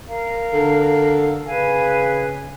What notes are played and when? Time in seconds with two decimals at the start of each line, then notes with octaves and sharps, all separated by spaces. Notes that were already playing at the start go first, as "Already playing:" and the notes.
0.07 A#4 F5 A#5
0.53 D3
1.45 C#3 B4 F5 G#5